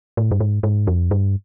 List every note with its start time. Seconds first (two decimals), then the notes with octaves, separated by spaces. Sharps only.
0.17 A2
0.31 G2
0.40 G#2
0.63 G#2
0.87 F2
1.11 G2